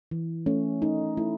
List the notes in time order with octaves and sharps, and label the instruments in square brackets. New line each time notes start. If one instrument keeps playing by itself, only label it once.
[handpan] E3
A3 C#4
A3 D#4
A3 E4